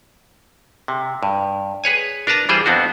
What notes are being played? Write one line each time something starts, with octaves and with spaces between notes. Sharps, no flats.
C3
G2
G#4 B4 C#5 G#5
D4 A#4 B4 A5 A#5
E3 G3 F4 G#4 C5 D5
F2 B3 C4 D4 F#4